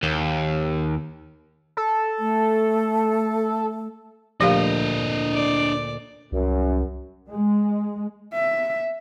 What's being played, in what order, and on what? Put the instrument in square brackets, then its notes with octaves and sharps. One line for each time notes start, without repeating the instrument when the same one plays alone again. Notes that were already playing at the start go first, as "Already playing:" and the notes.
[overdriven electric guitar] D#2
[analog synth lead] A4
[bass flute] A3
[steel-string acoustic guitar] D2 A#2 [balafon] F3 G4 F5 [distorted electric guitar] D4 D#5
[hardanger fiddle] D5
[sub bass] C2 [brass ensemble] F#2
[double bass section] G#3
[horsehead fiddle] E5